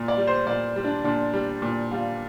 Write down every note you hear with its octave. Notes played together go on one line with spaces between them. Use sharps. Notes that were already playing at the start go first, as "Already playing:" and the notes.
Already playing: A#2
D5
G3
C5
A#2 D5
G3
D4
A#2 D4
G3
A#2
G3 F4